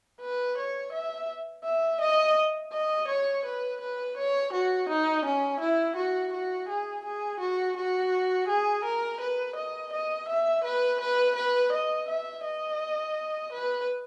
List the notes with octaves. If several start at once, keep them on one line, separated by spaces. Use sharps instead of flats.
B4
C#5
E5
E5
D#5
D#5
C#5
B4
B4
C#5
F#4
D#4
C#4
E4
F#4
F#4
G#4
G#4
F#4
F#4
G#4
A#4
B4
D#5
D#5
E5
B4
B4
B4
D#5
E5
D#5
B4